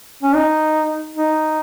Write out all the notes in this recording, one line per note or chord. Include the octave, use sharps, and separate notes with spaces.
C#4
D#4
D#4